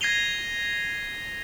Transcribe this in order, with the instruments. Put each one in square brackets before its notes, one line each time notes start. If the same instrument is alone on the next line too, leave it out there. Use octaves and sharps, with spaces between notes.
[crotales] G#6 A#6 C7 D#7 F7 G7